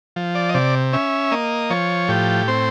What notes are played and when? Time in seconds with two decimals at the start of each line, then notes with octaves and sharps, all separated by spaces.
0.16 F3
0.35 D5
0.49 D#5
0.54 C3 D5
0.93 C#4 E5
1.31 A#3 D#5
1.70 F3 C#5
2.08 A2 G4
2.48 C4 C5